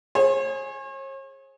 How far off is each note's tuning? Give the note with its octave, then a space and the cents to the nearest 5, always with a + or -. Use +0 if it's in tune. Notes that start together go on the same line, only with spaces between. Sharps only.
G#4 +0 C#5 -45